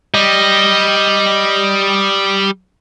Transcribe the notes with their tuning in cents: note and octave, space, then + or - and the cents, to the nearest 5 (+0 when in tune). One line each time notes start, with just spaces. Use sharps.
G3 +0 D#5 +0